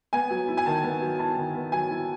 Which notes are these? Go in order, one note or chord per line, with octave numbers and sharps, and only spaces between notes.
B3 G#5
F#3
E4
G#5
D#3 A5
B3
F#3
E4 A5
D#3
B3
F#3 G#5
E4